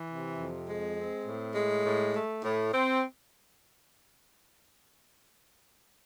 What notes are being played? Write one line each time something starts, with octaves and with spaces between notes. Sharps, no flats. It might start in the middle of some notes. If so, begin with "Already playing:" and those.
Already playing: E3
C3
F2
G#3
C4
A2
G#3
A2
A3
A2
C4